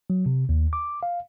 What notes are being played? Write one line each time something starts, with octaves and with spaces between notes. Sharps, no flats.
F#3
C3
D#2
D6
F5